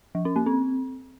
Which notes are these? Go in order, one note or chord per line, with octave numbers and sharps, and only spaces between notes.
F3
C#4
A#3
C4